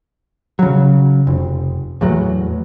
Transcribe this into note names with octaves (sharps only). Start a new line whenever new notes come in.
C#3 F#3
F1
E2 A2 F#3